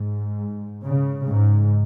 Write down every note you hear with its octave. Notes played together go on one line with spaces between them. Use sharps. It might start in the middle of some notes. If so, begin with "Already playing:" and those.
Already playing: G#2
C#3
G#2